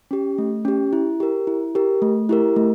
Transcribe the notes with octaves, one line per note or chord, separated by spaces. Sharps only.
C#4 G4
A3
C#4 G4
E4
G4 A#4
E4
G4 A#4
A3
E4 G4 A#4
A3